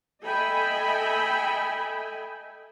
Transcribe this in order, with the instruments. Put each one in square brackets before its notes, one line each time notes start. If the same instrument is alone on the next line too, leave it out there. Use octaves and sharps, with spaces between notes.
[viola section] A4 D#5 E5 G5 G#5 B5